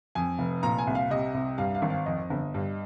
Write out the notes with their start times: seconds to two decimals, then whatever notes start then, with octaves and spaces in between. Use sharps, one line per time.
0.15 F2 G#5
0.38 F1
0.63 A#2 A#5
0.78 G#5
0.87 C2
0.95 F5
1.10 C3 D#5
1.34 C2
1.58 G2 F5
1.75 F5
1.82 G#1
1.90 F5
2.06 F2 D#5
2.30 G1
2.54 G2